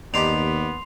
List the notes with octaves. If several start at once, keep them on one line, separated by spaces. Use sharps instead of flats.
D#2 B3 D4 D#4 G4 C6 C7 F7